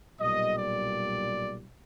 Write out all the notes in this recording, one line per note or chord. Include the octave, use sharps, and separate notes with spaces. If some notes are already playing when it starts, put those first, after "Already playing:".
B1 A#2 G3 D#5
D5